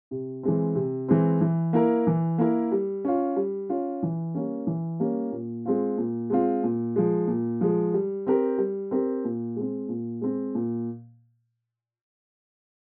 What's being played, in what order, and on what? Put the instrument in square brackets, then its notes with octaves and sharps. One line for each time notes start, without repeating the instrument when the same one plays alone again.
[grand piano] C3
E3 G#3 C4
C3
E3 G#3 C4
E3
A#3 E4 A#4
E3
A#3 E4 A#4
G3
C#4 F4
G3
C#4 F4
E3
G3 A#3 C#4
E3
G3 A#3 C#4
A#2
G#3 C4 F4
A#2
G#3 C4 F4
A#2
F3 G#3
A#2
F3 G#3
G3
C4 G4 A#4
G3
C4 G4 A#4
A#2
G#3 C4
A#2
G#3 C4
A#2